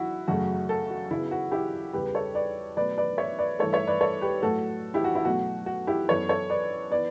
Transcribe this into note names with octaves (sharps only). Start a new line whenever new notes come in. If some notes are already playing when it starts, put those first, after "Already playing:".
Already playing: F#3 E4 F#4
F#2 C#3 F#3 A3 F#4
F#4 A4
F#4
C#3 F#3 B3 E4
F#4
E4 G4
E2 C#3 G3 B3 G4 B4
B4
A4 C#5
B4 D5
B2 F#3 A3 B4 D5
B4 D5
C#5 E5
B4 D5
G2 E3 A3 A4 C#5
C#5 E5
B4 D5
A4 C#5
G4 B4
A2 F#3 A3 F#4 A4
E4 G4
F#4
E4
B2 F#3 A3 F#4
F#4
E4 G4
F#2 E3 B3 A4 C#5
A4 C#5
B4 D5
E3 B3 B4 D5